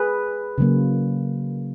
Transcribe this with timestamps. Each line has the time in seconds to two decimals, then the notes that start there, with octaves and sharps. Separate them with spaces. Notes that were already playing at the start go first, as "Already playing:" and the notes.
Already playing: G#4 B4
0.58 C#3 F#3 A#3